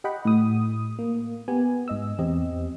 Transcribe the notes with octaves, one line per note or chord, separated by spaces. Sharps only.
G4 D#5 F#5 G5 B5
A2 D#6
A#3
B3 G4 G#5
G#2 D#5 E6
E2 C4 G4 D#5